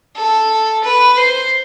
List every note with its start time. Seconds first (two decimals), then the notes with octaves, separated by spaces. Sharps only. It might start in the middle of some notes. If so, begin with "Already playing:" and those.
0.16 A4
0.84 B4
1.17 C5